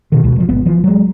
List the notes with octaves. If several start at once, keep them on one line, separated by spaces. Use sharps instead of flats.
B2 D#3
C#2 B2
D1 F3
G#1 B3
E3 F3
F#3 G#3